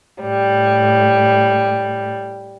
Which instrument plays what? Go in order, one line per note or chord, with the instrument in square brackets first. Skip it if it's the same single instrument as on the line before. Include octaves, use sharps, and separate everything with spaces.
[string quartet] A2 G3